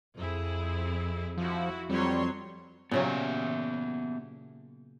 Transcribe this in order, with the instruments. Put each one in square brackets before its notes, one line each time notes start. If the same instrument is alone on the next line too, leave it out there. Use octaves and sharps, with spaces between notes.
[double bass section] F2 [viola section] C4 E4 G#4
[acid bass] F3 [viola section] E4 F#4
[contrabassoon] F2 [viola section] F#3 C#5 C6 [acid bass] G3
[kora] A#2 C#3 F#3 [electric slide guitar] B3 G4 E5